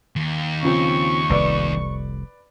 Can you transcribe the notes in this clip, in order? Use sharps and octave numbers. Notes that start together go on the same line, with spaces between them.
D#2
C#3 F3 C4 C#6
F1 C2 B4 D5